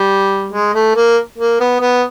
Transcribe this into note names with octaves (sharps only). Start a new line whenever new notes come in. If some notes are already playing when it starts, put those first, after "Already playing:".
Already playing: G3
G#3
A3
A#3
A#3
B3
B3